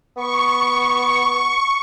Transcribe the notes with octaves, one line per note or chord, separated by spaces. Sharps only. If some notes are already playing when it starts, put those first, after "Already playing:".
B3 C#6